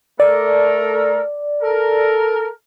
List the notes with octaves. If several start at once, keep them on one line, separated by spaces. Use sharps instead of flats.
A3 A4 A#4 D5
A4 A#4